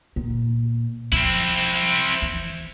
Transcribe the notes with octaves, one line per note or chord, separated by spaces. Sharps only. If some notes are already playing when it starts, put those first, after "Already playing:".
A#2
F3 C4 E4
E3